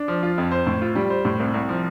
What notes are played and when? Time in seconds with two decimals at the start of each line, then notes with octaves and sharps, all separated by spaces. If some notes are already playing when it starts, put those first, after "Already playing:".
Already playing: D4
0.08 F3
0.23 F4
0.38 F2
0.52 C5
0.67 A2
0.82 F4
0.95 G3
1.10 C5
1.25 A2
1.40 C2
1.54 C2
1.69 F3